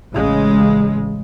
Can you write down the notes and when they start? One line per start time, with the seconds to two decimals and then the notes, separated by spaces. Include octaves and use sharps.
0.14 A1 C#3 G#3